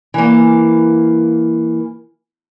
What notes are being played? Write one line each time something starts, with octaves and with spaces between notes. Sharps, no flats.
E3 A#3